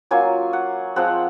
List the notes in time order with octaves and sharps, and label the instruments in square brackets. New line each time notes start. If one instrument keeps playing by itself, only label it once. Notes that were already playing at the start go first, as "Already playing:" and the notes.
[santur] F#3 A#3 C#4 F4 G#5
F#5
F3 G#3 C4 F#5